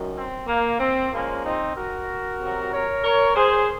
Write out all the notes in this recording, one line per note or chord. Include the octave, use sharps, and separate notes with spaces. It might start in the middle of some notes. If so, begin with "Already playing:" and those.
Already playing: F#2 D#3 F#3
C4
A#3
C4
A#2 F3 G#3 A#3 C#4
C4 D#4
F#4 A#4
C3 F#3
A#4 C#5
A#4 C#5
G#4 C5